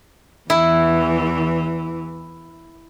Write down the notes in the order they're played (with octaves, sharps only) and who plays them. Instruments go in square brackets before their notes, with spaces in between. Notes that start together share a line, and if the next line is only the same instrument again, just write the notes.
[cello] E2 E3 [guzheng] E4